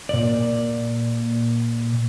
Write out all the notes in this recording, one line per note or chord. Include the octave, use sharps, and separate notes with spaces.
A#2 D5